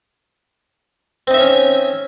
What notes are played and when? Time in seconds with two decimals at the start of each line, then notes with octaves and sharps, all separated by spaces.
1.27 C4
1.31 D#4
1.34 E5
1.37 C#5
1.41 C#4